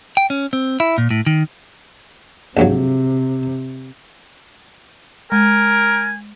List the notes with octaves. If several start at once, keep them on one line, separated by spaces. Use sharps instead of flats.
G5
C#4
C4
E4
A#2
A2
D#3
A#1 G#2 C3 F#3
G#3 A#4 G#5